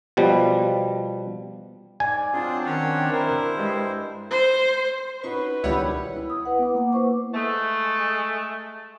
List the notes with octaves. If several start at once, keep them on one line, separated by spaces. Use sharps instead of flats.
B2 F3 G3
G#2 D5 G#5
F#3 C4 D4 F4 G#4
D#3 C#4 C#5 F#5
E4 A#4 C5
G2 G#3
C5
C#4 D#4 F#4 B4 C#6
C#2 B2 D#3 G3 E4 C#5 F#5
E4
D#6
B4 F#5
B3 D6
A#3 F#5
E4 B4 C5 C#6 D6
G#3 A3